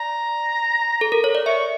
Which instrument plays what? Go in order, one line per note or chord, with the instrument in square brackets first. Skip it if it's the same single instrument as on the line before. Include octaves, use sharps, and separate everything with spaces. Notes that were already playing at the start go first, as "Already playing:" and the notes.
Already playing: [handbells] D5 [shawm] A#5
[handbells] A4
A#4
C#5
D5
[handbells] E5 [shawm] C#6